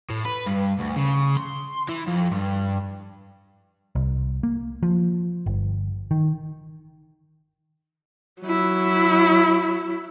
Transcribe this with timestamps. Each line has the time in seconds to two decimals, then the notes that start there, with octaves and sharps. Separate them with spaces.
0.10 A2
0.25 B4
0.46 G2
0.79 D2
0.96 C#3
1.37 C6
1.89 E3
2.07 F2
2.31 G2
3.95 C2
4.43 A#3
4.83 F3
5.46 G1
6.11 D#3
8.41 F#3 E4